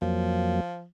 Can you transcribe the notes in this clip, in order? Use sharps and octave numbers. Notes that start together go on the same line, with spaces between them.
F2 F3 F#3 A#3